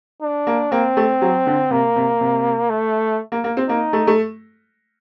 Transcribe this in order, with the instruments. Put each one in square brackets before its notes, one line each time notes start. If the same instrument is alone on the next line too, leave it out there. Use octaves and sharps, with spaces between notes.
[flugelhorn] D4
[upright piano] A#3
[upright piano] A#3 [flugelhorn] C4
[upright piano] A3
F#3
D3
[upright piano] C3 [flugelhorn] A#3
[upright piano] C3
C3
[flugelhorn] A3
[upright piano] A#3
A#3
C4
[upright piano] A#3 [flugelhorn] D#4
[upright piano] A3
A3